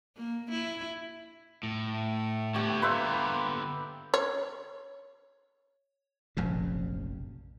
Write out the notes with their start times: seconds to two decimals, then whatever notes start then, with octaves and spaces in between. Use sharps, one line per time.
0.17 A#3
0.52 E4
1.63 A2
1.94 A3
2.54 D3 B3 G4 C#5
2.82 A#3 B4 C5 E5
4.14 C#5
6.37 F1 A#1 F#2 C#3